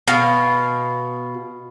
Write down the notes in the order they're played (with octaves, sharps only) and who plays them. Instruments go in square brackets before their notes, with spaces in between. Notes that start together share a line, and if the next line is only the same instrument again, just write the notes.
[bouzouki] B2 F5